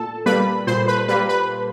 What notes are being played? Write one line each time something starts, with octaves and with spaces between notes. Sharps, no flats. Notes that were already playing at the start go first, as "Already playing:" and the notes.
Already playing: A#2 A4 A5
G3 A#3 B4 B5
A#2 C5 C6
B4 B5
G3 A#3 B4 B5
B4 B5